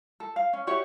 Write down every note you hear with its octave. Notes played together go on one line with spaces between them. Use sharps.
A4
F5
C#4
F#4 G4 C#5 E5